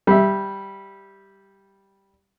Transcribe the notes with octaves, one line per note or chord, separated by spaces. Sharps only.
G3 E5